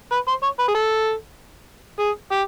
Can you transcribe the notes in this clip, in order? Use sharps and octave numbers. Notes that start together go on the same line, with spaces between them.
B4
C5
C#5
B4
G#4
A4
G#4
G4